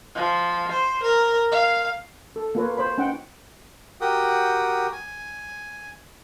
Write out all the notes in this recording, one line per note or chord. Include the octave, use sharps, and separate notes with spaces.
F3
C5
A#4
F5
A4
A#3 F4 B4 C#5
C5 C#5 B5
C#4 D#4 F#5 G5
F#4 G4 A#4 F#5 G5 D#6
G#5